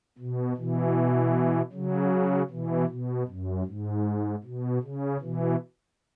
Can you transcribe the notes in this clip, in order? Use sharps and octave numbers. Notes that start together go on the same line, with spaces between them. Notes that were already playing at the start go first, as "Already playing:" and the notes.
B2
B2 E3
C#3 F#3
B2 E3
B2
F#2
G#2
B2
C#3
B2 E3